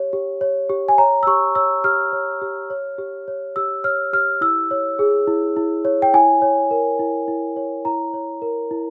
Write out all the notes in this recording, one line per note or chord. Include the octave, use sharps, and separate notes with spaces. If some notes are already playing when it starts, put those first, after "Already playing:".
Already playing: G4 C#5
G4
C#5
G4
G#5
C#5 A#5
E6
G4 C#6
C#5 E6
G4 F6
C#5
G4
C#5
G4
C#5
G4 E6
C#5 F6
G4 F6
E4 E6
C#5
G#4
E4
E4
C#5
G5
E4 G#5
C#5
A#4
E4
E4
C#5
E4 A#5
C#5
A#4
E4